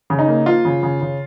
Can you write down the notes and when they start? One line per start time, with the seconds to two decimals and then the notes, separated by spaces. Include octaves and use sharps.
0.10 C#3
0.19 D#4
0.28 A#3
0.46 F3 F4
0.65 C#3
0.83 C#3
1.01 C#3